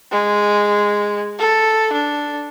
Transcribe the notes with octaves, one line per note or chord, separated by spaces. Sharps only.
G#3
A4
D4